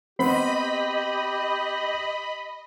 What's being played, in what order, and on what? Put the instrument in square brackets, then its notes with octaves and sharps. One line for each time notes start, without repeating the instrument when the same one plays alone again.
[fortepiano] B3 C4 [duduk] G4 [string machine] D#5 [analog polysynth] B5